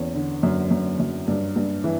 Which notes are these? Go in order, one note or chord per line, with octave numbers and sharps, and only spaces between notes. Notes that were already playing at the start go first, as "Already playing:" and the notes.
Already playing: E2 C#4
D3
F#2
F#2
F#2
G2
G2
E3